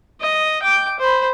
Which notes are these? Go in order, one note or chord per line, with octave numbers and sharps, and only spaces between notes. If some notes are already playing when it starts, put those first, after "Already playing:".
D#5
G5 D6
C5 B5